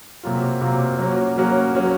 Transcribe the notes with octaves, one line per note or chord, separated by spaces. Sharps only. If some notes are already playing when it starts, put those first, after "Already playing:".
C3 F#3 A#3 F4
C3 F#3 A#3 F4
F#3 A#3 C#4 F#4
F#3 A#3 C#4 F#4
F#3 C#4 F#4